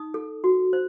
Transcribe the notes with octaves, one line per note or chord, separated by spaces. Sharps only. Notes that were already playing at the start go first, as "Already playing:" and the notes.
Already playing: D#4 D#6
A4
F#4
C5